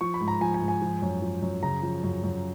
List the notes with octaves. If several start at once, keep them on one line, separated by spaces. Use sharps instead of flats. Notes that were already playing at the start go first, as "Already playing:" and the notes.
F3 C#6
B5
G#2
A#5
F3 G#5
G#5
G#2
G#5
F3
F#2
F3
F#2
C#3 A#5
F3
F#2
F#2